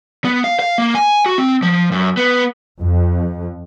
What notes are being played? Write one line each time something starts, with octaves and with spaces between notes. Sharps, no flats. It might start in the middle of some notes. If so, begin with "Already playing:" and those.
B3
F5
F5
A#3
G#5
F#4
C4
F3
F#2
B3
F2